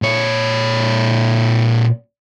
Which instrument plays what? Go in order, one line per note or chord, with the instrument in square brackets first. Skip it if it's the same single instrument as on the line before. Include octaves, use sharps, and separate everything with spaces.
[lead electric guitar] A#2 C#5